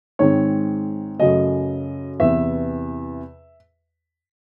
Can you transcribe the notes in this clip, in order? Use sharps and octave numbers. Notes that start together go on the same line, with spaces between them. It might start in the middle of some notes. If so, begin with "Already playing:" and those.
G#2 D#3 G#3 C4 C#5
F#2 C#3 F#3 A3 D#5
E2 C3 E3 E5